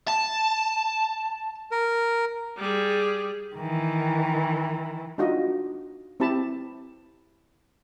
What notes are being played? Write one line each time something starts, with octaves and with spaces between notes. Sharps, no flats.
A5
A#4
G3 G#4
D#3 E3
D4 D#4 F4 F#4 D#5
C4 E4 G4 A5 B5